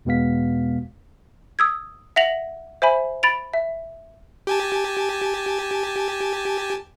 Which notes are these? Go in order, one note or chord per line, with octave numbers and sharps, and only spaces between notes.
E2 B2 G#3 B3 F5 B6
D#6 E6 G#6
E5 F#5 A#6 F7 F#7
C5 E5 G#5 B5
B5 A6 D7 F7
E5
G4 G#5 A5